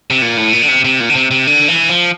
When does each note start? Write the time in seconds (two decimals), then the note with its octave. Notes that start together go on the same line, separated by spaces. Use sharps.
0.10 C3
0.22 A#2
0.37 A2
0.53 A#2
0.62 D3
0.68 C3
0.85 C3
1.00 A#2
1.10 D3
1.15 C3
1.31 C3
1.47 D3
1.68 E3
1.89 F3